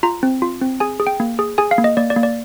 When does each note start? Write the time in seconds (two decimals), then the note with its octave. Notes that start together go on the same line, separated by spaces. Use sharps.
0.03 F4 A#5
0.23 C4
0.42 F4
0.61 C4
0.80 G#4 G#5
1.00 G#4
1.07 G5
1.20 A#3
1.39 G#4
1.58 G#4 G#5
1.71 F5
1.78 A#3
1.84 D#5
1.97 A#3 D5
2.10 D5
2.16 A#3
2.23 D5